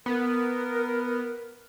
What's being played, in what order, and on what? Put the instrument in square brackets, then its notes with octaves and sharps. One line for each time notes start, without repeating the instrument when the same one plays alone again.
[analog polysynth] B3 [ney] A#4